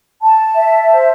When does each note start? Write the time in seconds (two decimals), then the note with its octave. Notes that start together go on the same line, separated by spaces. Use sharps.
0.22 A5
0.56 E5
0.89 C5